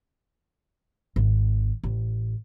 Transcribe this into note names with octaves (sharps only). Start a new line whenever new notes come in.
G#1
A1